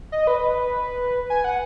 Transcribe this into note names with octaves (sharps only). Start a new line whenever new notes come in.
D#5
B4
G#5
F#5